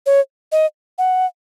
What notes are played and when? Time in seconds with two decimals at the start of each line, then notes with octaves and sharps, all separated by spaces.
0.06 C#5
0.52 D#5
0.98 F#5